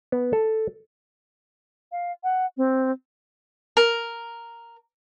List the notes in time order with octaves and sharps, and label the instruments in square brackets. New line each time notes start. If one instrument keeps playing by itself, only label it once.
[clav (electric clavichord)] B3
A4
[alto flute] F5
F#5
C4
[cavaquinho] A#4